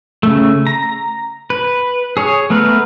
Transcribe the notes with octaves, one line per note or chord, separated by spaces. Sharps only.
C#3 A3
A#5
B4
G#4 C#5
A3 B3 A#4 B4